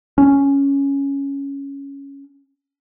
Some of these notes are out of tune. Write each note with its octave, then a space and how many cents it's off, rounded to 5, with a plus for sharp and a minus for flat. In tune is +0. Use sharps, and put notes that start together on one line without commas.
C#4 +5